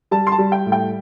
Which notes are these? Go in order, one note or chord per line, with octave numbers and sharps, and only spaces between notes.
G3 A5
C6
A5
G3
G5
A2
G5